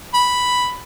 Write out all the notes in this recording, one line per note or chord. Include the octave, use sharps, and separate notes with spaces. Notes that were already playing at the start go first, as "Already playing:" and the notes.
B5